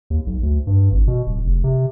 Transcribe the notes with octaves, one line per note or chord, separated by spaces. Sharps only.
D#2
B1
D2
G2
G#1
B2
D1
F1
C3